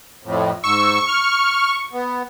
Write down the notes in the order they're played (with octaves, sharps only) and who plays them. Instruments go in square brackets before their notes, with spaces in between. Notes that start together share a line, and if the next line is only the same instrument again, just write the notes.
[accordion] F2 A2
[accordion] G#2 E6 [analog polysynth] C#6
[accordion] F6
B3